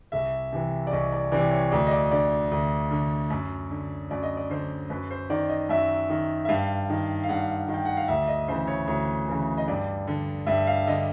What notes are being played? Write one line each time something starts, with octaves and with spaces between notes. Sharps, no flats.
C2 E5
C3 E3
D5
C2 D#5
D5
C3 E3 D5
C#5
D2 D5
D#5
D5
D3 D5
D2
D3
F#2
D3
F#2 D5
D#5
D5
D3 C5
F#2 B4
C5
D#3 D5
D#5
F#2 E5
D#3
E5
G2 F5
D#3
F5
G2 F#5
D#3
G5
F#5
F5
D2 E5
D#5
C#3 E3 C5
C#5
D2 C#5
C#3 E3
D#5
G2 D5
D3
G2 E5
F5
D3 D#5